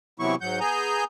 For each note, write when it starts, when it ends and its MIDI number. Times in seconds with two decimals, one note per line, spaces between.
0.20 0.35 48
0.20 0.35 52
0.20 0.35 54
0.20 0.35 59
0.20 0.35 64
0.20 0.35 85
0.41 0.60 44
0.41 0.60 54
0.41 0.60 78
0.41 0.60 91
0.60 1.04 59
0.60 1.04 68
0.60 1.04 80
0.60 1.04 82
0.60 1.04 91